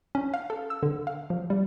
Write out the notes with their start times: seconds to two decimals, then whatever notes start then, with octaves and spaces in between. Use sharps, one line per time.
0.15 C#4
0.34 F5
0.50 A4
0.70 E6
0.83 D3
1.07 F5
1.30 F3
1.50 G3